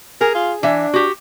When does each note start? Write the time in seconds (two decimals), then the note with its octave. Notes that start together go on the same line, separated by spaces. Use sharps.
0.21 G#4 A#4
0.35 F4
0.63 E3 D4 E5
0.94 F#4 G4